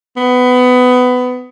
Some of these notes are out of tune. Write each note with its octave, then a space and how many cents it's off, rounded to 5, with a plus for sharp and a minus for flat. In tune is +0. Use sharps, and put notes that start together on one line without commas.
B3 +20